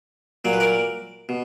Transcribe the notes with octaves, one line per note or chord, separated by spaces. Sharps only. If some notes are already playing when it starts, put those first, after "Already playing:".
A#2 F#3 D5
B4
A#4 D5
B2